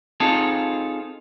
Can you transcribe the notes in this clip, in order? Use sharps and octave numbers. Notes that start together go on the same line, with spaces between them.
C4 D#4 F4 G#4 A4